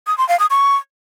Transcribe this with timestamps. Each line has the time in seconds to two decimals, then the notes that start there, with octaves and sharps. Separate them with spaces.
0.07 D#6
0.18 C6
0.29 F5
0.39 D#6
0.50 C#6